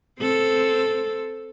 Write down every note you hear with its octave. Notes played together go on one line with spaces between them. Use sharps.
C4 A4